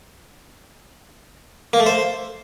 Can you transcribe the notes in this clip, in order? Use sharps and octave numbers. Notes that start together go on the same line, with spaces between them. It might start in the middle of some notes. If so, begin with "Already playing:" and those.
A#3
A3
C5